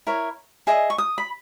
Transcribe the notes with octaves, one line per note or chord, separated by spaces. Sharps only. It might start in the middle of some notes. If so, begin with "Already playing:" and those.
E4 A#4 C#5
G#4 D#5 E5
C#6
D#6
B5